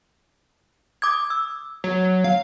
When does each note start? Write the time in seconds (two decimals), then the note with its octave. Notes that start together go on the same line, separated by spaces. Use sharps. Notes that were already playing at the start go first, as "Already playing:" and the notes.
1.02 D6 D#6 G#6
1.30 E6
1.84 F#3
2.24 F5